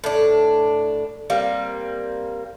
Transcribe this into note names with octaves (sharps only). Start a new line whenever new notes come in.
A2 D4
G3 A#3 C4